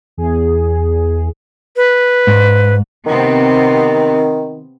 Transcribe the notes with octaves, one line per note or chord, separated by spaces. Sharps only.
E2 G#4
B4
G#2
C3 D#3 B3 C4